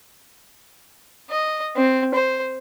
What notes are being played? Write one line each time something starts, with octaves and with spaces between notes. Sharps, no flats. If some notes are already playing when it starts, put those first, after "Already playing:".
D#5
C4
C5